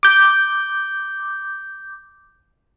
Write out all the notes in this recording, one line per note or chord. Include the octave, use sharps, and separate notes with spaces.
D6 G6